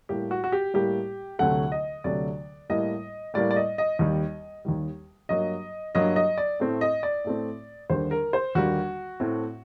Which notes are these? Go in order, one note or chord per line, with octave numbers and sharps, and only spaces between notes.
A2 G3 A#3 G4
F#4
F#4
G4
A2 G3 A#3 G4
D2 C3 F#3 A3 F#5
D#5
D2 C3 F#3 A3 D5
A2 G3 A#3 D#5
A2 G3 A#3 D5
D5
D#5
D#5
D#2 D#3 G3 D#5
D#2 D#3 G3
G2 F#3 A#3 D#5
G2 F#3 A#3 D#5
D#5
D5
A2 A3 C4
D#5
D5
A2 A3 C4
D#2 D3 G3 A#3 C5
A#4
C5
D#2 D3 G3 A#3 F#4
A2 A3 C4